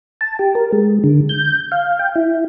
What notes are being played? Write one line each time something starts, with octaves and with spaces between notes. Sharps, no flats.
A5
G4
A#4
G#3
D3
G6
F5
G5
E4